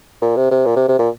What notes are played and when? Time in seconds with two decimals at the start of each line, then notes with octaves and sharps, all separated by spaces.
0.22 A#2
0.36 C3
0.51 C3
0.66 A#2
0.76 C3
0.88 C3
0.99 A#2